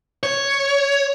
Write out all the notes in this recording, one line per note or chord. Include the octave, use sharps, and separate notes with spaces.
C#5